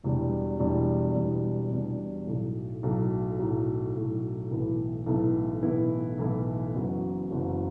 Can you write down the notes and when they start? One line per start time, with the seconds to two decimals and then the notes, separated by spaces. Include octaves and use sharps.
0.04 E1 E2 B2 G3 D4
0.59 E1 E2 B2 G3 D4
1.15 E1 E2 B2 G3 D4
1.71 E1 E2 B2 G3 D4
2.27 B1 A2 F#3
2.83 B1 A2 F#3
3.39 B1 A2 F#3
3.95 B1 A2 F#3
4.51 B1 A2 E3 B3 E4
5.06 B1 A2 E3 B3 E4
5.63 B1 A2 E3 B3 E4
6.18 B1 A2 E3 B3 E4
6.74 F#1 F#2 E3 B3 F#4
7.30 F#1 F#2 E3 B3 F#4